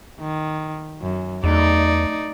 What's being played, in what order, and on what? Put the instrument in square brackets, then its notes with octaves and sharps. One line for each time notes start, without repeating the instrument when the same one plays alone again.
[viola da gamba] D#3
F#2
[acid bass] E2 [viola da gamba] A3 D#4 D5